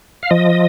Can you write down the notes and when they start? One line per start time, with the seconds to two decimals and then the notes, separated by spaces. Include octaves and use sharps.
0.23 F5
0.31 F3 D#5